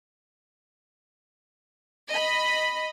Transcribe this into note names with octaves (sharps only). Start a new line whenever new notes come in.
D#5 B5